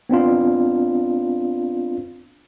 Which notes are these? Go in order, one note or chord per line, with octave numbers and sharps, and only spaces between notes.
B3 C4 D4 F4